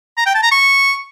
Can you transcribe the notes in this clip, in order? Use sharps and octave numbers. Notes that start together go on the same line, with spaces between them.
A#5
G5
A5
A#5
C#6